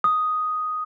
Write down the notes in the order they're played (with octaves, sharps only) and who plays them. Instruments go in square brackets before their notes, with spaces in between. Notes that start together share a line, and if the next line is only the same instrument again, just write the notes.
[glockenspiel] D#6